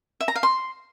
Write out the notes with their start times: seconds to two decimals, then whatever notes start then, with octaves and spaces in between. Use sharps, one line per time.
0.20 E5
0.28 A#5
0.36 F5
0.43 C6